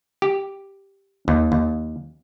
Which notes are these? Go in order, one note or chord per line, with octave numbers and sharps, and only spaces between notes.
G4
D#2
D#2